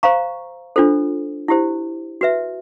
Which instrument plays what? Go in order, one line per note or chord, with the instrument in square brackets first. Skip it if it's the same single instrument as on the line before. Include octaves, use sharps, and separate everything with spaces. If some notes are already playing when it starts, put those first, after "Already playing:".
[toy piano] C5 F5 A#5 C#6
D4 F4 A4 C5
E4 G4 C5
F#4 B4 E5